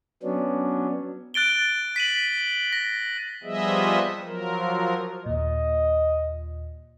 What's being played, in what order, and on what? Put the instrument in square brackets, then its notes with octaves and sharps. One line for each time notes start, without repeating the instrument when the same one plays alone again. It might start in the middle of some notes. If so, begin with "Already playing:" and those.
[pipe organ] F#3 B3 C#4 D4
[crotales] F#6 A6 D7 G7
B6 D#7 F#7
A#6
[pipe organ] F3 G3 B3 G#4 D#5 E5
F3 F#3 A#4
[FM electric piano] D#2 A#2 [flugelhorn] D#5